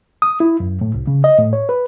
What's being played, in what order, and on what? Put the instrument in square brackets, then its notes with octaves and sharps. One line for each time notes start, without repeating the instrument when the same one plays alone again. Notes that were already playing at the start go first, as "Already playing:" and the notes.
[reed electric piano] D#6
E4
F#2
A2
C2
C#3
D#5
A2
C#5
B4